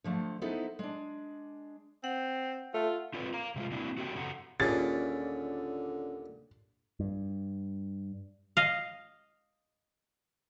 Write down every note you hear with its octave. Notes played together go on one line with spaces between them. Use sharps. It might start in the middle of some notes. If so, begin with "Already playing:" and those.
D3 F3 A3
B3 D#4 E4 A4 C5
G#3 D4
C4 F#5
A3 F4
C4 F4 A4 B4 C#5 D5
F5 A#5
C3 G#3 F4
F#3 A#3 C4 D4 E4
F#4 G4 A4 C#5 D#5 G5
F#2 C#3 F#3 A4 F#5 A#5
D#2 A#2 D3 C#4 F4 G#4 A6
G2
D#5 F5